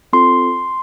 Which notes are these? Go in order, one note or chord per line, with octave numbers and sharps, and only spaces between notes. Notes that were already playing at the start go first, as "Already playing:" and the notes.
C4 F4 A4 C6